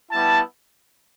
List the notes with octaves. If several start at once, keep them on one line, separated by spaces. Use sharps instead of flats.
G3 B3 E4 A5